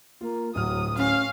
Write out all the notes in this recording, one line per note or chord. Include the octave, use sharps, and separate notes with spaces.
A#3 F4
D1 F#3 D#6 F6
C#4 F5